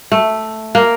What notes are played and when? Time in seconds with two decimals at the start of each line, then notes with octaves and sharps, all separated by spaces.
0.12 A3
0.75 A#3